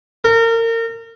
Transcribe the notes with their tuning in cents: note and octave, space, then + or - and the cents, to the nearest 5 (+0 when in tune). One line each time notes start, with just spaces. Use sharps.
A#4 -30